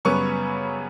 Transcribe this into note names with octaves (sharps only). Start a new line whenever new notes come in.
F#2 C#3 G3 B3 C#5 C#6